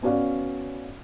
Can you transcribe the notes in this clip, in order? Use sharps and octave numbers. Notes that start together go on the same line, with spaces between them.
B3 C#4 F#4 D5 F5